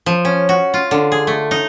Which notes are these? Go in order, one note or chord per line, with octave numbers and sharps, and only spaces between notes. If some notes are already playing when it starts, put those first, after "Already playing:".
F3
C#4
F#4
F4
D3
G#4
A3
D#4